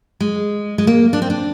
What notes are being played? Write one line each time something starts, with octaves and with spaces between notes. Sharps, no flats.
G#3
G#3
A#3
D4
C4
D4